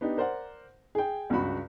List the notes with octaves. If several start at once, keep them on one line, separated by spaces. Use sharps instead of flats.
B3 D4 D#4 G4
A#4 C5 D5 F#5
G#4 G5
C#2 G2 C#3 F#4 B5